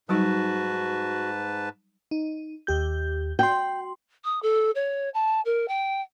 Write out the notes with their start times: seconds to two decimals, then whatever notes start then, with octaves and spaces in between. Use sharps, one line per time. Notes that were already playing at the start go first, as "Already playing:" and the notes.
0.09 G#2 F#3 G3 D#4 F#4 B4 A5
2.11 D#4
2.67 D#2 G4 G6
3.39 F#4 G5 C6
4.24 D#6
4.42 A4
4.75 C#5
5.14 A5
5.45 A#4
5.68 G5